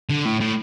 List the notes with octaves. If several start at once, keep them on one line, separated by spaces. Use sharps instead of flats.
D3
A2
A2